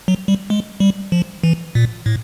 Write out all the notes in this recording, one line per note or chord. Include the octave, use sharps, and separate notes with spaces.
F#3
G3
G#3
G3
F3
E3
A#2
A2